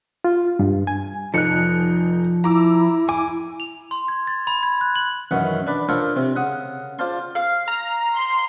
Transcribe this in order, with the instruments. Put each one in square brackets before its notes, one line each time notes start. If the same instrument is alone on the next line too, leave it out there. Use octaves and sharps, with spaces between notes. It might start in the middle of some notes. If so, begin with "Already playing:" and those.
[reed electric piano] F4
G2
G#5
[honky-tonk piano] F1 D#4 C#7 [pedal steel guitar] F3 F#6
[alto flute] E4 [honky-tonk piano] A#5 D6 E6
[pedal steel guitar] G#5 [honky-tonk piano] D6
[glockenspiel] F7
C6
G#6
A6
B5
G#6
F#6
F#7
[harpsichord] F#2 D#3 E3 C#4 D#4 F#5
D4 B4 D5
D4 F4 A4 A#4 C5 C#5
C3 C4
C#3 F#5 D#6
F4 C5 D5 F5 A5 C6
[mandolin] F5
[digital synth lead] A#5
[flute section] C6